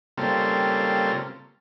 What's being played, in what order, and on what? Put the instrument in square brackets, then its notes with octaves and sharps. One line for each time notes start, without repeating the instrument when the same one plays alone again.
[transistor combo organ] C#3 G3 A#3 C4 F4 A4